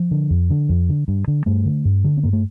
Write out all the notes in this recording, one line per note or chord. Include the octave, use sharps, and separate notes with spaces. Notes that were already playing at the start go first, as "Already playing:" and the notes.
Already playing: F3
D3
F2
D3
F2
D3
G2
D3
G2 A3
D3
G2
D3
C4
G2 A#3
A3